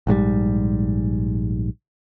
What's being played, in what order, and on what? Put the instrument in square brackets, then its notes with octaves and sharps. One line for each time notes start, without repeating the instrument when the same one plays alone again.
[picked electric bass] A#1 G#2 C3 G3